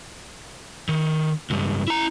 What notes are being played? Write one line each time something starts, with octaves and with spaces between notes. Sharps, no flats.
D#3
C#2 G2
E4 A#5